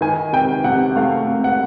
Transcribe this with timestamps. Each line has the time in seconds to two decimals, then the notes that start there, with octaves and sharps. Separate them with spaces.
0.01 D#3 G#5
0.33 C3 G5
0.64 C3 F#5
0.96 A3 F5
1.28 C3
1.44 F#5